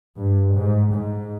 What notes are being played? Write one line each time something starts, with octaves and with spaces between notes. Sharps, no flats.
G2
G#2
G#2